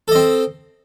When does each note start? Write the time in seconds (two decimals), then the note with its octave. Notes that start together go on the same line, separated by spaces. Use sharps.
0.08 A4
0.11 D#5
0.15 C4